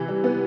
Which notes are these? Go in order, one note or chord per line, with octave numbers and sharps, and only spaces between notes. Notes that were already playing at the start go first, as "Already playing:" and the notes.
Already playing: C3 E3
G3
B3